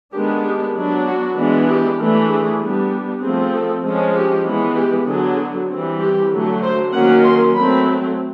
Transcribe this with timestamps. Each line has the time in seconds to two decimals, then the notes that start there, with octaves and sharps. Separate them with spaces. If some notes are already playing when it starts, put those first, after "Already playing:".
0.13 D#3 G#3 B3 D4 G4
0.44 G4
0.75 F#3 B3 D4
1.06 F#4
1.37 E3 G#3 B3 D4
1.67 G4
1.99 E3 A3 D4
2.29 G#4
2.60 G3 B3 D4
3.22 F3 A3 C4 G#4
3.53 A4
3.84 F3 G#3 C#4
4.15 G4
4.46 E3 G#3 B3
4.76 G4
5.07 D3 F#3 B3 G#4
5.70 E3 G3 C4
6.00 G4
6.31 D3 F#3 A3
6.63 C5
6.93 D#3 F#3 A#3 C#4 F#5
7.24 C6
7.55 F#3 A3 C4 B5